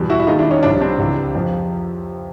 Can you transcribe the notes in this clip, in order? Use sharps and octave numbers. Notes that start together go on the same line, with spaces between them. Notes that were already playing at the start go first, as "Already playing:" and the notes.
Already playing: E2 B2 G3
E4 F#4
E4
D#2 D#3 G#3 D#4 F4
D4 E4
C#4 D#4
C2 C3 F3 D4 E4
C4 D4
C#2 C3 E3
F2 C3 F3